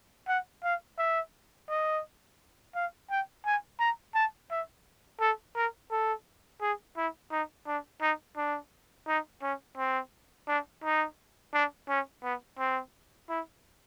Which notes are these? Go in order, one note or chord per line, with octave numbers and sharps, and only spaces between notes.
F#5
F5
E5
D#5
F5
G5
G#5
A#5
A5
E5
A4
A#4
A4
G#4
E4
D#4
D4
D#4
D4
D#4
C#4
C4
D4
D#4
D4
C#4
B3
C4
E4